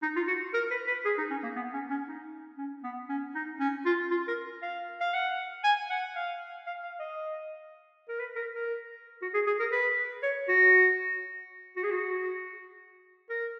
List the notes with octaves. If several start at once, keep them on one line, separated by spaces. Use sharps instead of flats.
D#4
F4
F#4
A#4
B4
B4
G#4
D#4
C#4
A#3
B3
C#4
C#4
D#4
C#4
B3
C#4
D#4
C#4
F4
F4
A#4
F5
F5
F#5
G#5
F#5
F5
F5
F5
D#5
A#4
B4
A#4
A#4
F#4
G#4
G#4
A#4
B4
C#5
F#4
F#4
G#4
F#4
A#4